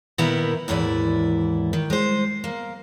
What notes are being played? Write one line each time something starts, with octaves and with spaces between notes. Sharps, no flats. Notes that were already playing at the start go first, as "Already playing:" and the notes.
A#2 D#3 B3 E4 A#4 A#5
D#2 G#2 E3 E4 D5
D#3
G#3 C5
A#3